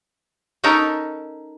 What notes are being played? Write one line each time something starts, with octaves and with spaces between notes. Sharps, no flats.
C#4 D#4 A4 A#4